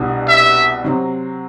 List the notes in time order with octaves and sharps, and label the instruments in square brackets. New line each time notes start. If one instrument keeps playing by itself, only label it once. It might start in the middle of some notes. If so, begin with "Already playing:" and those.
Already playing: [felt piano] C2 B2 G3 D4 F#4
[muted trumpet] E5
[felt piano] C3 F#3 C4